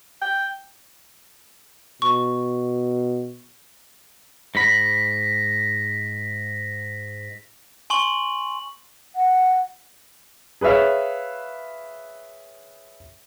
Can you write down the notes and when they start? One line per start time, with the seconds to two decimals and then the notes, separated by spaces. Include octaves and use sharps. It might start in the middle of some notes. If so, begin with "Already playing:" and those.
0.22 G5
2.02 B2 C#6
4.55 G#2 B5 A#6 B6
7.90 G#5 C6 C#6 F#7
9.15 F#5
10.61 G#4 B4 C#5 E5 F5